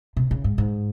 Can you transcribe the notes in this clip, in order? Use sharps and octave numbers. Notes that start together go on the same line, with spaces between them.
C3
C#3
G#2
G#2